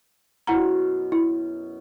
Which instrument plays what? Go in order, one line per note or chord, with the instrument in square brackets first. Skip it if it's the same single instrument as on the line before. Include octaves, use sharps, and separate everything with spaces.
[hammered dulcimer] F#2 B2 [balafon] E4 F#5 A#5
[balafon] E4